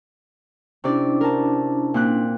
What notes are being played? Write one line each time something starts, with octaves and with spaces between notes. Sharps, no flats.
C3 C#4 D4 E4 D5
A#4 A5
A#2 C4 F#6